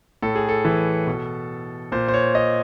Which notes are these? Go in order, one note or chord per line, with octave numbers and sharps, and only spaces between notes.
A2 A4
G#4
A4
E3
B2
A#2 C5
C5
C#5
D#5